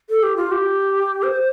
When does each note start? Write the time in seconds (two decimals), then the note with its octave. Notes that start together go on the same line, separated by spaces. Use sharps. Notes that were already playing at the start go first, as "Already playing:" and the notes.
0.10 A4
0.23 G4
0.36 F4
0.51 G4
1.23 C5